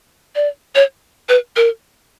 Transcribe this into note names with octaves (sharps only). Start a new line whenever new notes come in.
D5
C#5
B4
A#4